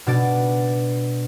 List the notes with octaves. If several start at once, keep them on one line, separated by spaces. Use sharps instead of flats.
B2 D4 D5